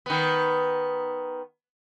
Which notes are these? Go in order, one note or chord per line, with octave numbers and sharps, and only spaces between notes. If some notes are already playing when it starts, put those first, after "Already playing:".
D#3 B3